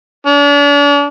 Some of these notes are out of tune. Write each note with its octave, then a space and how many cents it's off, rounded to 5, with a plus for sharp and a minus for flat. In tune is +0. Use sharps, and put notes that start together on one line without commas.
D4 -40